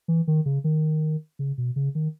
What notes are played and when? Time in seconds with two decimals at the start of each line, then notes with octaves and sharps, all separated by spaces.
0.08 E3
0.28 D#3
0.46 C#3
0.64 D#3
1.39 C#3
1.58 B2
1.76 C#3
1.95 D#3